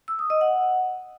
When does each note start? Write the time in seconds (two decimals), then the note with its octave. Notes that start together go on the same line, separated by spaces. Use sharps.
0.08 E6
0.19 D#6
0.30 D#5
0.41 F#5